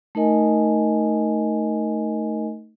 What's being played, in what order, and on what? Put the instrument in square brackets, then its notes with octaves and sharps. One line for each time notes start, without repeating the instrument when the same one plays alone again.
[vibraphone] A3 D#4 A#4 D#5 G#5